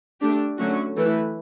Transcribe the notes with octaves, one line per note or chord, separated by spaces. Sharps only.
A3 D4 G4
D3 F#3 A3 C#4 F#4
E3 A3 E4 B4